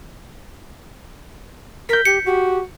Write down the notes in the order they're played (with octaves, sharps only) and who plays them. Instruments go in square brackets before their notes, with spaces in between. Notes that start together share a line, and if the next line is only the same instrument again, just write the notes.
[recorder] A#4 [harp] G6 B6
[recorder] G4 [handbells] C#7
[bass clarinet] F#4 [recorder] G4